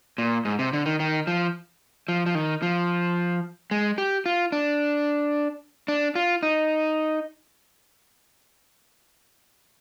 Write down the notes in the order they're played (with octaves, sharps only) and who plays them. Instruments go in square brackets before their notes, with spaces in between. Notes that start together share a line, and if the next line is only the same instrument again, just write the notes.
[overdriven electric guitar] A#2
G#2
C3
D3
D#3
D#3
F3
F3
F3
D#3
F3
G#3
G4
F4
D4
D4
F4
D#4